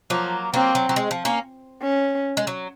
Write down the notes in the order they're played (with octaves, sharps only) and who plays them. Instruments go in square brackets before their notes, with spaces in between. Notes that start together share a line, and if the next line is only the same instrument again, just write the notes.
[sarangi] F3 [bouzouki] F#3 A#3
[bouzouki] F#3 A#3 [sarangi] C4
[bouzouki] F#3
F#3
G#3
F3
A#3 C#4
[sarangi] C#4
[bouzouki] G#3
F#3